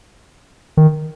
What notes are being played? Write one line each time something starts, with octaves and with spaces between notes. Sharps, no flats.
D#3